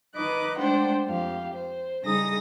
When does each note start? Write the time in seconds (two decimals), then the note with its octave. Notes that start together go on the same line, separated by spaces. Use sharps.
0.15 D#3 D#4 B4 D#5 D6 F#6
0.58 G#3 A3 D4 C5 F#5 G5
1.07 F2 G4 F5
1.54 C5
2.03 C#3 G3 D#4 G#4 D#6 A#6